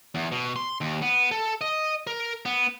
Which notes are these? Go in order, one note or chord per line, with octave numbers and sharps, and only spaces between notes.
E2
B2
C6
D#2
B3
A4
D#5
A#4
B3